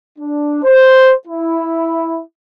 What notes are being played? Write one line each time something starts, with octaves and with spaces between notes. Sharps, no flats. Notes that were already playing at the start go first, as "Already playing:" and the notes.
D4
C5
E4